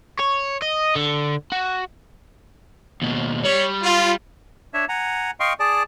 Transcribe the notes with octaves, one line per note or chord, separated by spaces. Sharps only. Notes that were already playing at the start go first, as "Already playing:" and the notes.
C#5
D#5
D3
F#4
D#2 B2
G3 C#5
F4
D4 C#5 E5
F#5 G#5 A#5
D#5 F5 G5 C6 C#6
G#4 D5 A5